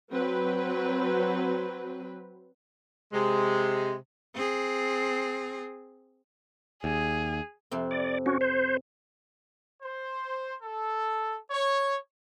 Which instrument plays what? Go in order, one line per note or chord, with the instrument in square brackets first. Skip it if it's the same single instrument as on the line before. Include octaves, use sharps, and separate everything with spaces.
[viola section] F#3 C4 B4
[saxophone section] C3 G#3
[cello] C4 G#4
[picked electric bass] D#2 [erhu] G#4
[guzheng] F2 C3 C4
[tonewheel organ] D5
C#4 F#4
C5
[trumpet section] C5
A4
C#5